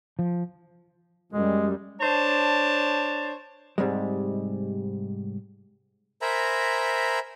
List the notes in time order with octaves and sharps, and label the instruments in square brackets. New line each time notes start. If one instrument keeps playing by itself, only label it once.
[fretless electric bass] F3
[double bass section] F#2 G3 [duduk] G#3
[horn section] D4 C5 C#5 A5
[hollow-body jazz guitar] G#2 C3 G3 G#3
[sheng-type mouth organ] A#4 C5 E5 G#5 A#5 B5